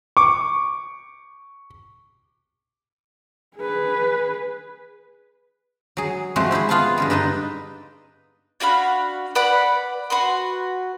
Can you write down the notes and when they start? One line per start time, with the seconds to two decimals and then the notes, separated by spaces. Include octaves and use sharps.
0.17 C#6 D6
3.57 G#4 B4
5.97 F#3 G#4
6.36 F3 G#3 A3 C4 F#4
6.51 C4 E4 G4 G#4
6.69 B3 F4 G#4 G#5 A5
6.98 G2 D3 G#3
7.10 D4 D#4 A4 B4 D#5
8.60 D4 F#4 F5 B5
9.35 B4 D5 F#5 B5
10.10 F#4 B4 C6